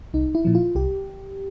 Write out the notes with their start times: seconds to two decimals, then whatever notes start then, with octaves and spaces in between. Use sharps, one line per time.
0.14 C2 D#4
0.35 E4
0.45 A#2 F3
0.55 F4
0.75 C2 G4